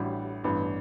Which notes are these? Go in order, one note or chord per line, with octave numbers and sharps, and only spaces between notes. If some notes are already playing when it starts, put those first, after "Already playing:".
Already playing: A1 A2 G3 D4 F#4
A1 G2 E3 B3 D4